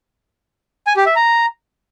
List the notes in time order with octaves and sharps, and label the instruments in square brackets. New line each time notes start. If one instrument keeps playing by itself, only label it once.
[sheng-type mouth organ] G#5
G4
E5
A#5